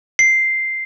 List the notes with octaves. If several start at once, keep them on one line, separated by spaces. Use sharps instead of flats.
C7